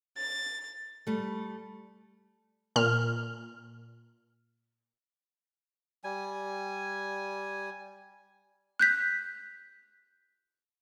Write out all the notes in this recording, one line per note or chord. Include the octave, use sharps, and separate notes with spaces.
A6
G3 A3
A#2 F6
G3 G#5
F#6 G6 B6